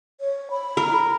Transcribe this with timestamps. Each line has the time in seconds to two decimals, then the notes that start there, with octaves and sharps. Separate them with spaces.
0.21 C#5
0.51 B5
0.77 A#4